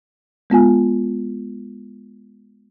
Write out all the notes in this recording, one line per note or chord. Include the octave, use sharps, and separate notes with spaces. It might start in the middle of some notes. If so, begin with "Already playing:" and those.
G#3 B3 F4 G#5